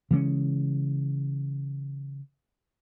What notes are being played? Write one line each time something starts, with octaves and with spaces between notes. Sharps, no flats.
C#3 E3 G#3 C#4